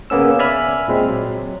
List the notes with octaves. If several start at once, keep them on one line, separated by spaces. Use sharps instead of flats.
C#3 A#3 B3 C#4 E6
D5 E5 G#5 B5 F6
A#2 G#3 C4
F#3